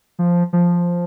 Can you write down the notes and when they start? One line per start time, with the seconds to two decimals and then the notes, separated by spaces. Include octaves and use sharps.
0.19 F3
0.53 F3